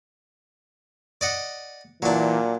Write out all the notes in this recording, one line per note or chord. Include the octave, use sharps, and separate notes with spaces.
D5 D#5 F#5
A#2 E3 F#3 D4